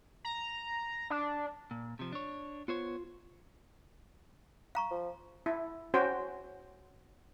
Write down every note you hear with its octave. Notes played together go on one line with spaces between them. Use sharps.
A#5
D4
A#2
C3 F3
D4 C#5
B3 F4 C5 C#5
F5 A#5 C#6
F3
E4
C#4 F#4 C5 G5